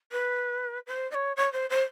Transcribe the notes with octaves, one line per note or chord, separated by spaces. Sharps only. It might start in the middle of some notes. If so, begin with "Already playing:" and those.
B4
C5
D#5
C#5
C#5
C5
C5